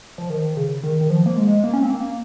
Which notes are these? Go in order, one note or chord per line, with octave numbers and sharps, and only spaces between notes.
F3
D#3
C#3
D#3
D#3
F3
A#3
G#3
A#3
C#4
C4
A#3